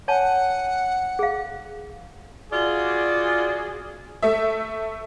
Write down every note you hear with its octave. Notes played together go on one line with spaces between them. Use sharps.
C#5 F#5 G#5 A5
G#4 F5
F4 F#4 G#4 D5
A3 E5